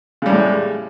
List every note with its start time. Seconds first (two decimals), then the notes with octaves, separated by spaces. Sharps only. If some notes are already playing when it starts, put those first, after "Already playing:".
0.22 C#3
0.26 G3
0.30 A2
0.33 G#3